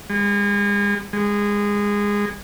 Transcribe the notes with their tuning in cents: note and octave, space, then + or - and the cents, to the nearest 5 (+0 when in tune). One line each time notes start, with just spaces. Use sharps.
G#3 -40
G#3 -20